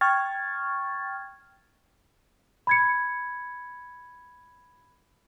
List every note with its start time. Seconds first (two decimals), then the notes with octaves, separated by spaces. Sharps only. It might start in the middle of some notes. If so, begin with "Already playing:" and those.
0.01 G5 C#6 F6 G#6 A6
2.67 B5 G#6 C#7